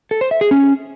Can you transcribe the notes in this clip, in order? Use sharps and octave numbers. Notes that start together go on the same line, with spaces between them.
A4
C5
E5
G#4
C#4